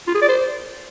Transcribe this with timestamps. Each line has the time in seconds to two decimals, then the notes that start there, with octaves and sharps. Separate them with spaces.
0.08 F4
0.15 G#4
0.22 D5
0.29 C5